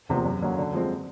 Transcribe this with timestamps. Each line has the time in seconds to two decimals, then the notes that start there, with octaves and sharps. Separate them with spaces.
0.09 E2 C3 F3 A#3
0.25 F#2
0.41 D3 F#3 A#3 C#4
0.57 D3
0.73 F3 G#3 C4